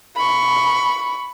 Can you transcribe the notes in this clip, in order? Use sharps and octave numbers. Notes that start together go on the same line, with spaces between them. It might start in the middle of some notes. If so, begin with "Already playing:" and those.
B5 C#6